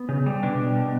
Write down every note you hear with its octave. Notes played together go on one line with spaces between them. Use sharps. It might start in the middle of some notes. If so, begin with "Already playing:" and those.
Already playing: B3
C#3
G3
B2 D4
G3
B2